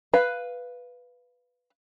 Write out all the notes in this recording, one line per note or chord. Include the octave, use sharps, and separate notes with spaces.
B4 F5